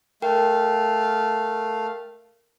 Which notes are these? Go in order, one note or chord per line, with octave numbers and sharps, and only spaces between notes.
A3 A#4 F5 G5